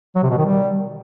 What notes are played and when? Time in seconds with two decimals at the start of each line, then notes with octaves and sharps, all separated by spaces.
0.16 F#3
0.23 C3
0.30 B2
0.38 D#3
0.45 G3